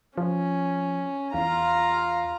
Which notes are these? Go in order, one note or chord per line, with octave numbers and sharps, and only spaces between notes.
F3 C#4
E2 F4 F5 A#5